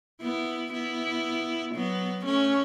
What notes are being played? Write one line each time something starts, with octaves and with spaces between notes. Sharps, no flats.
B3 E4
B3 E4
F#3 B3
A3 C#4